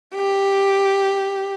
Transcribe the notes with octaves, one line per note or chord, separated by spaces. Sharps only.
G4